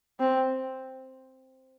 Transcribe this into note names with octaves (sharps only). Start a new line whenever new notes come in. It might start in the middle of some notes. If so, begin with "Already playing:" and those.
C4